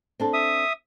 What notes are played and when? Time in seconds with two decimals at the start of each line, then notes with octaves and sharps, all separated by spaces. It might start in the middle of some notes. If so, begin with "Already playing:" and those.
0.20 C4 D4 A4
0.33 E5 D#6